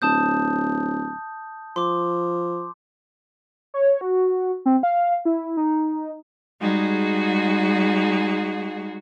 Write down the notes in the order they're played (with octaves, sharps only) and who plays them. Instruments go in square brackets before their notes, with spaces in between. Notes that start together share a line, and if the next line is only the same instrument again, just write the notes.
[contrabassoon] D1 [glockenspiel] A5 D#6 G6
[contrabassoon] F3 [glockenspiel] C6 D6
[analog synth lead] C#5
F#4
C4
F5
E4
D#4
[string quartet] G3 G#3 D#4 F#4 G#4